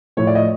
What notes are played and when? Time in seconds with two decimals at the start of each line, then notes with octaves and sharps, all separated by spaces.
0.17 A2 F3 A3 C#5
0.27 D5
0.35 D#5